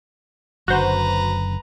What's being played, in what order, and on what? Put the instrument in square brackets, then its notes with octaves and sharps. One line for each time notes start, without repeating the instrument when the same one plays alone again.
[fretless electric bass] F#1 F#2 D3 [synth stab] F#4 C5 [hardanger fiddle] B4 A#5